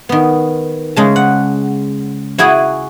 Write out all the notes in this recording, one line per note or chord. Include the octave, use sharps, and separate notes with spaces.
D#3 B3
C#3 G#3 A5
F#5
E4 F#4 G#4 G#5